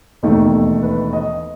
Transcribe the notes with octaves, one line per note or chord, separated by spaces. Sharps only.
E1 D#2 D#3 A3
B4
D#5